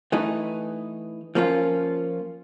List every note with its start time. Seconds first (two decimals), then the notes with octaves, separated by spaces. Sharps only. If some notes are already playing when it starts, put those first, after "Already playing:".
0.12 E3 A3 D#4
1.35 F3 A#3 C#4 F4